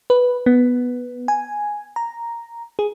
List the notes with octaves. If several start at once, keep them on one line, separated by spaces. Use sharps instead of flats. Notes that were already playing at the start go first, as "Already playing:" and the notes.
B4
B3
G#5
A#5
G#4